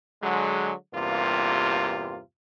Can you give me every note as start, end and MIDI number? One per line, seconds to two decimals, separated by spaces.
0.22 0.73 50
0.22 0.73 54
0.22 0.73 56
0.94 2.19 40
0.94 2.19 43
0.94 2.19 48
0.94 2.19 58
0.94 2.19 65